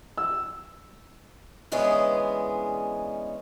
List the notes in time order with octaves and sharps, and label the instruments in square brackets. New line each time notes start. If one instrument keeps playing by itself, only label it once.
[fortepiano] E6
[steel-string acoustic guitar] D3 E3 G#3 B3 C#4 G#4